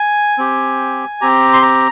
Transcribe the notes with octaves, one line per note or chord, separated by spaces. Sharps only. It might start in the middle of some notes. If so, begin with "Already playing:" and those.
Already playing: G#5
C4 G4
C4 G4 A#5
C6
A#5